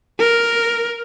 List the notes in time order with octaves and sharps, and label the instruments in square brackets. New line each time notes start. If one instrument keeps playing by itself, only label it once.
[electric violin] A#4